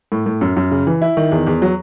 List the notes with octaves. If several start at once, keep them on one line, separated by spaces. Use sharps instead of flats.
A2
A2
F#2
F#2
C#3
E3
E4
D#3
E2
E2
F#3